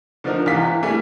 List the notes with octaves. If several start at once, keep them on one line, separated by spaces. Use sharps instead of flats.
D3 F3 D4 D#4 A#4
E2 G#2 C3 E3 F5 B6
E3
G3 A3 A#3 E4 G#4